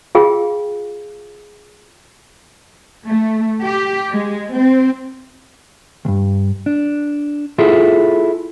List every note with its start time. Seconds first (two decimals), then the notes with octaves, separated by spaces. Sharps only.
0.15 F4 G#4 F5 G5
3.07 A3
3.65 G4
4.11 G#3
4.56 C4
6.05 C#2 G2
6.66 D4
7.58 E4 F4 G#4 A4